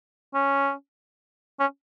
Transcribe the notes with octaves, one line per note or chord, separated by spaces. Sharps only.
C#4
C#4